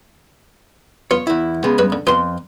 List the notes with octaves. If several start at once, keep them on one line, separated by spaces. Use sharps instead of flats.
B3 F4 C#5
E2 E4
C#3 G#3 B3
G2 B4 B5
D3
F2 B3 F4 C6